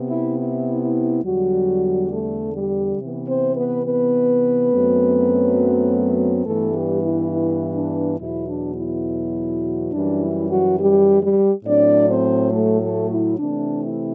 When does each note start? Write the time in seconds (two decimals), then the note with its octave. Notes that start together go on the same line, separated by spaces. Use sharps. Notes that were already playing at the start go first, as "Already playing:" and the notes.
Already playing: C3 B3
0.08 E4
0.38 E4
0.81 E4
1.24 E2 D3 F#3 G3 F#4
2.11 A3 A4
2.54 G3 G4
2.98 C3 E3 B3
3.26 C4 C5
3.55 B3 B4
3.84 B3 B4
4.71 F#2 F#3 A3 C4
6.45 G2 E3 A3 B3 A4
6.73 G3 G4
7.03 E4
7.31 E4
7.75 D4
8.18 E2 B2 F#3 E4
8.48 D4
8.76 E4
9.92 F#2 E3 G3 D4
10.21 E4
10.50 F#3 F#4
10.78 G3 G4
11.21 G3 G4
11.65 A2 F#3 C4 D4 D5
12.09 C4 C5
12.51 A3 A4
12.81 A3 A4
13.10 E4
13.38 C3 E3 A3 C4 D4
13.82 E4